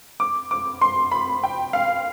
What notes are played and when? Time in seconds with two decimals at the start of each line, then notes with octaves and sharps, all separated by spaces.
0.20 D6
0.51 D6
0.81 C6
1.11 B5
1.44 G5
1.73 F5